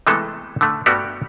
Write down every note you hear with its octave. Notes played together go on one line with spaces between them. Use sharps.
C3 E3 G#3 A3 B3 A4
D3 A3
G2 G3 A3 B3 F#4 G4